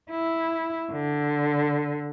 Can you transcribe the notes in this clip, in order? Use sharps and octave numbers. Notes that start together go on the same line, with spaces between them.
E4
D3